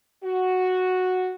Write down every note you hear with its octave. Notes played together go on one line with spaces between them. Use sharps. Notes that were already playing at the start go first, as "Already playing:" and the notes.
F#4